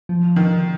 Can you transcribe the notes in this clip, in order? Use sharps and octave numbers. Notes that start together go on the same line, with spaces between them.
F3
D3 D#3